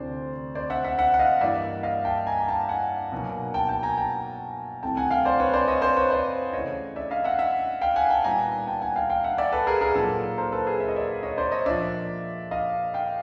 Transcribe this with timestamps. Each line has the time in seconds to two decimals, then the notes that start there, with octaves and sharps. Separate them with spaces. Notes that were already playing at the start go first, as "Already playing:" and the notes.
Already playing: D2 C3 E3 A3 D4 C5 D5
0.55 C5 D5
0.70 E5 F#5
0.84 E5 F#5
0.98 E5 F#5
1.14 F#5
1.19 D#5 F5
1.41 G2 E3 G3 A#3 D5 E5
1.83 D#5 F5
2.05 G5 A5
2.27 G#5 A#5
2.39 A#5
2.48 G5 A5
2.69 F#5 G#5
3.12 B2 F#3 A#3 D#4
3.54 G5 A5
3.69 G5 A5
3.83 G#5 A#5
3.98 G5 A5
4.83 C2 C3 E3 A3 G5 A5
4.97 F#5 G#5
5.11 F5 G5
5.25 C5 D5
5.40 B4 C#5
5.54 C5 D5
5.68 C#5 D#5
5.82 C5 D5
5.97 B4 C#5
6.11 C5 D5
6.53 C#3 E3 A3 C#5 D#5
6.96 D5 E5
7.10 D#5 F5
7.24 E5 F#5
7.39 E5 F#5
7.81 F5 G5
7.96 F#5 G#5
8.10 G5 A5
8.24 A#2 G3 B3 D#4 G#5 A#5
8.67 G5 A5
8.82 F#5 G#5
8.96 F5 G5
9.10 F5 G5
9.24 E5 F#5
9.38 D5 E5
9.52 A4 B4
9.67 G#4 A#4
9.81 G#4 A#4
9.95 A#2 F#3 A#3 D#4 A4
10.38 A#4 C5
10.52 A4 B4
10.67 G#4 A#4
10.80 E5
10.88 D#5
10.96 D5 E5
11.23 C#5 D#5
11.38 C5 D5
11.52 C#5 D#5
11.66 A#2 F3 A#3 D4 D5 E5
12.51 D#5 F5
12.94 F5 G5